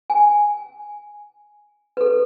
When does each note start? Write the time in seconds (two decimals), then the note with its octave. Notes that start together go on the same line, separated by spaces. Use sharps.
0.10 G#5
1.97 A4 B4